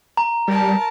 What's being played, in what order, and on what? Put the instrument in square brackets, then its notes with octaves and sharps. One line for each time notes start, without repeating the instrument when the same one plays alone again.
[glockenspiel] A#5
[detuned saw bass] G3 [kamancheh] A#4 A5